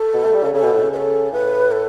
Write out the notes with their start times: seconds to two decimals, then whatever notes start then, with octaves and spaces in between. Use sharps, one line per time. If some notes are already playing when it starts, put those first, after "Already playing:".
Already playing: A4
0.14 B2
0.24 A3
0.34 G3
0.43 C#3
0.54 C#3 A4
0.63 B2
0.74 A2
0.83 C#3
0.93 B4
0.96 A4
1.32 A2 B4
1.72 A4